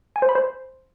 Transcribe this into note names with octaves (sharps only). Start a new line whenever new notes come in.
G#5
C5
B5
C5